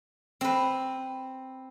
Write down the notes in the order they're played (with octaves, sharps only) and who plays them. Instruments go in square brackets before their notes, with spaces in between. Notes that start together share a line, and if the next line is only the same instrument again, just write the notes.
[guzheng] C4 B4